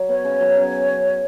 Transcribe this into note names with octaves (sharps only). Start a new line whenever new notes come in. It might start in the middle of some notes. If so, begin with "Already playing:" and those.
Already playing: F#3
B3 C#5
C#3
F#3
C#3